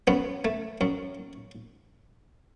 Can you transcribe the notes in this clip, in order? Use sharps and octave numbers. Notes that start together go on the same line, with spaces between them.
F#2 B3
A3
F#2